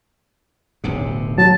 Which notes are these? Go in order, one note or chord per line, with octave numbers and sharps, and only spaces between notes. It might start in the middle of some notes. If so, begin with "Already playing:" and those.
D1 B1 C3
F#3 A5